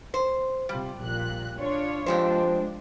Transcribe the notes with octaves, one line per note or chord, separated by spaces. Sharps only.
C5
C3 G3 F4
A#1 A#2 F#6
D4 F4 C#5
F2 F3 G#3 D4 G4 C5